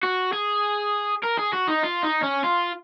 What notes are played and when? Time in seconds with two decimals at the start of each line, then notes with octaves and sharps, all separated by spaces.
0.03 F#4
0.33 G#4
1.24 A#4
1.39 G#4
1.53 F#4
1.68 D#4
1.83 F4
2.04 D#4
2.23 C#4
2.44 F4